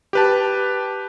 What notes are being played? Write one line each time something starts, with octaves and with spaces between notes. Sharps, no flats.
G4 B4 A5